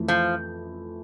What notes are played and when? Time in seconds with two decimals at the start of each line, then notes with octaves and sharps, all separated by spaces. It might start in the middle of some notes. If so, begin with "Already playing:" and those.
Already playing: F2 E3 A3
0.08 F3